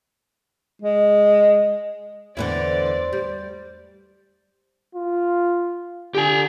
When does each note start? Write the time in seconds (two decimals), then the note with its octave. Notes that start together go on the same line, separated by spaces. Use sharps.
0.82 G#3
2.37 E2 D3 E3 A3 E4 C5 D5
3.13 G3
4.95 F4
6.15 D3 G4 G#5